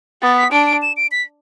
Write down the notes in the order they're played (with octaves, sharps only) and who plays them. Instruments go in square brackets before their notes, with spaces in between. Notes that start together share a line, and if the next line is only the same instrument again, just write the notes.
[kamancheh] B3 [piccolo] A6
[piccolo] B6
[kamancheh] D4 [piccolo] D7
[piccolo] D7
E7
D7
B6